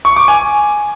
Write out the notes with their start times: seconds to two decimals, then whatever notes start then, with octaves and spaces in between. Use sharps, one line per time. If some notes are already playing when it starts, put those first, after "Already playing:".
0.05 C#6
0.16 D6
0.28 G#5